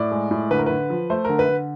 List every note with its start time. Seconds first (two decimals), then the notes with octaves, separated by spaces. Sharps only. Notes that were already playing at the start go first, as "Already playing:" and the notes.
Already playing: A2 D5
0.12 G#3
0.31 A2
0.51 D3 B4
0.59 A#4
0.66 D3 B4
0.90 F3
1.10 A3 C5
1.25 D3 A#4
1.39 B4
1.49 D3